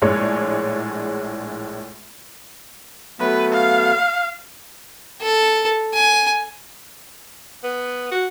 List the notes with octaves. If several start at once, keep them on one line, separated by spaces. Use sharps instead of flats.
A#1 A2 G#3 D4 C#5 D5
F#3 A3 B3 B4
F5
A4
G#5
B3
F#4